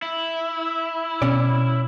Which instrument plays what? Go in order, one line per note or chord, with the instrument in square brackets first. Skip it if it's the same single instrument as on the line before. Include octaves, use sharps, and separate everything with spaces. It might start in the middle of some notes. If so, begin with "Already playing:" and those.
[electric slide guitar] E4
[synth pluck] B2 [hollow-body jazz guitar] C#4 D5